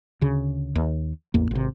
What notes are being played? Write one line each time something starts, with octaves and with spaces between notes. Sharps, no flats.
D2 C#3
D#2
A1 E2 A#3
G#1 C3